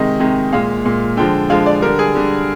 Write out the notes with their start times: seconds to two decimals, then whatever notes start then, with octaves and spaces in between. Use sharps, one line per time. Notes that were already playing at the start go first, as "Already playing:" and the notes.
Already playing: C3 D#3 G#3 D#5
0.20 C3 D#3 G#3
0.52 A#2 G#3 F5
0.85 A#2 G#3
1.17 D3 F3 G#3 G5
1.50 D3 F3 G#3 F5
1.66 D5
1.82 D3 G3 A#4
1.99 G#4
2.15 D3 G3